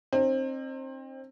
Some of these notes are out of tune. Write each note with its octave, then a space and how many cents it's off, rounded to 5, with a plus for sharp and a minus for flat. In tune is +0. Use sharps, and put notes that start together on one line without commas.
C4 +25 D#4 -40